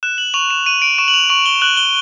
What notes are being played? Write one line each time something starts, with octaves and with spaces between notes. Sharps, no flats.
F#6 E7
F#7
C#6 F7
E7
C#6 D#7
D7
C#6 E7
F#7
F7
C#6 F#7
G7
F#6 F#7
G7